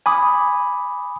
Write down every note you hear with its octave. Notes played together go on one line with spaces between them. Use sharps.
G#5 B5 D6 D#6